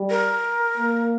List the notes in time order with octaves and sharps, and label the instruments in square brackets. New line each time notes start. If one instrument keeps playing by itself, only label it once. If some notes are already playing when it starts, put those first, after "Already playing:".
Already playing: [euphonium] G3
[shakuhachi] A#4
[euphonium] A#3